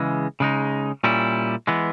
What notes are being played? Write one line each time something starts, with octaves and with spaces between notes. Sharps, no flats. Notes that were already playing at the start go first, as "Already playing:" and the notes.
Already playing: C#3 E3 G#3
C#3 G#3 D#4
A#2 G3 C#4 E4
E3 G#3 B3